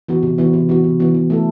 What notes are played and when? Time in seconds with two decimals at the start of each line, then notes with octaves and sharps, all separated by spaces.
0.08 E3 B3 F#4
0.23 C3
0.38 E3 B3 F#4
0.53 C3
0.69 E3 B3 F#4
0.84 C3
1.00 E3 B3 F#4
1.14 E3
1.30 A3 E4 A4